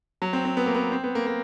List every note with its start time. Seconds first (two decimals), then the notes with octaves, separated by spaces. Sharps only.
0.22 F#3
0.33 C4
0.45 C4
0.57 B3
0.66 A#3
0.75 B3
0.92 C4
1.04 B3
1.15 A#3
1.27 A#3